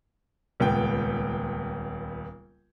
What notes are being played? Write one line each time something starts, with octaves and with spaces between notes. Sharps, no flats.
D#1 C#2 B3 G5